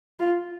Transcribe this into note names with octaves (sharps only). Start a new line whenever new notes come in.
F4